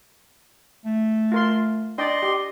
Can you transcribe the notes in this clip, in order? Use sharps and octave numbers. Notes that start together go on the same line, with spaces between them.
A3
F4 A#4 C6
D4 D5 D#5 G5 C6
G4